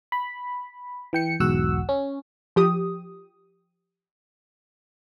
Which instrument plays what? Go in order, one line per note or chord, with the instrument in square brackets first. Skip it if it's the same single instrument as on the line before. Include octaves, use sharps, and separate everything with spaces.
[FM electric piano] B5
E3 G5 C#7
B1 E2 G#2 F#4 F#5 E6
C#4
[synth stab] F3 G4 D#6